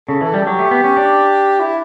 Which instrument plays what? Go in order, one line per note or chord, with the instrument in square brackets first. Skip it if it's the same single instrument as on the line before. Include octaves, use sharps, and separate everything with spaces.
[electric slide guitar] C#3 [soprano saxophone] A4
[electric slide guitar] E3 [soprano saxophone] A4
[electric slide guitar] G3
[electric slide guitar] F#3 [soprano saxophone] G4
[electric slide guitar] A3
B3
C#4
D4
[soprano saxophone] E4